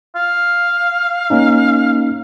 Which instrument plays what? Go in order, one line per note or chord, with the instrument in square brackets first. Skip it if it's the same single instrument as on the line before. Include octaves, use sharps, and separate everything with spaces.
[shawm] F5
[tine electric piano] A#3 C#4 D#4